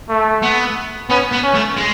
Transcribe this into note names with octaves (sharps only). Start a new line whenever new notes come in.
A3
B3
B3 C#4
B3
C#4
A3
G#3